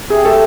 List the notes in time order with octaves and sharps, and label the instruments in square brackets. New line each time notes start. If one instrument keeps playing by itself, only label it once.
[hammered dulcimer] C3 [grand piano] G#4
[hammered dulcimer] A3 [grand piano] A4